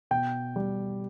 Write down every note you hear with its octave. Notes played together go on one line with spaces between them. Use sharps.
B2 G5
G3